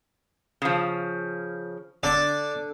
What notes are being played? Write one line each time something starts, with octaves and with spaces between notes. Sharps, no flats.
C#3 F3
D3 D5 A5 D6